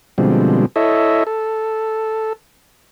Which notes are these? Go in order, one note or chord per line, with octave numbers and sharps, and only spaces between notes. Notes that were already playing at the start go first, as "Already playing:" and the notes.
B2 D3 F3 G3 G#3 C4
E4 A4 C#5 D#5 E5
A4